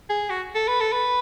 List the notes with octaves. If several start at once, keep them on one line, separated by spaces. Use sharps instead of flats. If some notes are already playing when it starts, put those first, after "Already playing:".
G#4
F#4
A4
B4
A4
B4